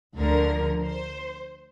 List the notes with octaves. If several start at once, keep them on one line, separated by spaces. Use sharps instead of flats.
D2 D3 F3 A#4
C5